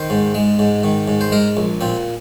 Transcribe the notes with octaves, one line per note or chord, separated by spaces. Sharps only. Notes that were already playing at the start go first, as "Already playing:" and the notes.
Already playing: D#3 C5
G#2
G#3
G#2
D#3
G#2
C5
G#3 A#4
A#1
A#2 C4